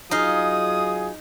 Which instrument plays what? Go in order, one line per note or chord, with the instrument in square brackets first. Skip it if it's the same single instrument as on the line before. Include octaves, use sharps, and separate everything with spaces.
[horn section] F#3 F4 G#4 [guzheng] D#4 F5 [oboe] D#6